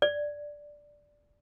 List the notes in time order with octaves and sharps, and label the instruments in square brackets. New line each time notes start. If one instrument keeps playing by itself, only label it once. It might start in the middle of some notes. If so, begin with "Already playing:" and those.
[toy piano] D5